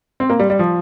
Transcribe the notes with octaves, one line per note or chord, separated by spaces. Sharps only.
C4
A#3
G3
G3
F3